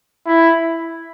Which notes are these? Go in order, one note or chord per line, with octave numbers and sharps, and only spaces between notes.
E4